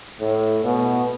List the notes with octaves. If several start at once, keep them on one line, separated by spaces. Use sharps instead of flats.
A2
B2